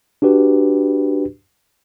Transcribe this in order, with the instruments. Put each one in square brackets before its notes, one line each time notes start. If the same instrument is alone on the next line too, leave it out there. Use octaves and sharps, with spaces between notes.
[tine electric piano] D4 F#4 G4 B4